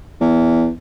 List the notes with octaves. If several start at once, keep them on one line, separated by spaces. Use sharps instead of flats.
E2